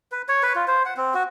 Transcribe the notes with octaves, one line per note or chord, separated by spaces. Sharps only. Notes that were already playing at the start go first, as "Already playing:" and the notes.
B4
C#5
B4
F4
C5
F#5
C4
F#4